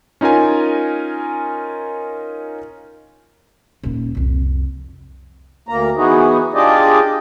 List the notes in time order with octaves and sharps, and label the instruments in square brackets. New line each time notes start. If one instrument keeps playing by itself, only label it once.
[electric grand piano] C#4 D#4 F4 A#4 G#5
[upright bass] D#1 A#3
C2 F2
[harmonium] D2 A#3 A#5
E3 B3 D#4 F#4 G#4
D4 F4 G4 G#4 D5 D#5